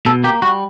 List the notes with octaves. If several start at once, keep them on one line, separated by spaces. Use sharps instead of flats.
B2 A4
A#3 G4
G3 F#4